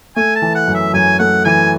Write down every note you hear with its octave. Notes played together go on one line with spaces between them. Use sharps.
A3 G#5
A5
E3
F#5
F#2
E5
F#2 G#5
A3 F#5
E3 G#5